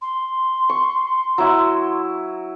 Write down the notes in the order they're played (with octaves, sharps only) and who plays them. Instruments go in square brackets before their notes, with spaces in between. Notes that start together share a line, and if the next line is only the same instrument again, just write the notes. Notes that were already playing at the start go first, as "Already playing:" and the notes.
[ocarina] C6
[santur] C#6
F#3 E4